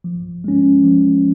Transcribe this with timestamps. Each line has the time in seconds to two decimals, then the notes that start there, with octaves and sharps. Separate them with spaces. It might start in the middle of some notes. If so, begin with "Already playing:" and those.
0.04 F3
0.44 G#3 C#4
0.84 F3